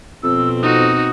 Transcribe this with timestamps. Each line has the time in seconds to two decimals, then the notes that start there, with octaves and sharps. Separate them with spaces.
0.23 F2 B2 C4 E6
0.63 D#4 F#4 D#6